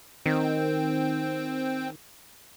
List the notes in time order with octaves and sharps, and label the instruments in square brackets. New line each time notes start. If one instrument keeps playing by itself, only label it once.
[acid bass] D#3 [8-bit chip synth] C4 G5